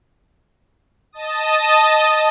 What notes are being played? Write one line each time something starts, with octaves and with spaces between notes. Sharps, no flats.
D#5 A5 D#6